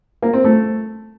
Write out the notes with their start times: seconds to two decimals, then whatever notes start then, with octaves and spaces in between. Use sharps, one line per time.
0.22 A#3
0.33 C4
0.44 A3